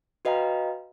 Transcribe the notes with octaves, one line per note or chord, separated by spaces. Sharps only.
F#4 B4 D#5 F5 G5 A#5